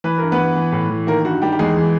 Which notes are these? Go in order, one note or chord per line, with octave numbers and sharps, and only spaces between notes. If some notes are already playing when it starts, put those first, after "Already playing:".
E3 B4
G2 A#4
B3 B4
E3
E3
A2
E3
D#3 A#3 A#4
G2 F#4
D#3 G3 G4
G4
E2 G#3 G#4
E3